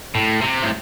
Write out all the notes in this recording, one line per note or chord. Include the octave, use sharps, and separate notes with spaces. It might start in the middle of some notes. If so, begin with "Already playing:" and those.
A2
C3
A2